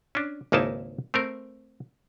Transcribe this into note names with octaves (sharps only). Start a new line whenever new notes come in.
C#4 D4
G#1 C#2 A#3 D#4 E4 A5
A3 C4 A#4